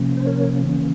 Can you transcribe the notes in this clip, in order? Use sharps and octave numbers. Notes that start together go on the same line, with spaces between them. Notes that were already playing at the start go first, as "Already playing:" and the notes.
Already playing: C3 F3 A#3 C#4
C5
A#4 C#5
C#3 E3 A#3 C#4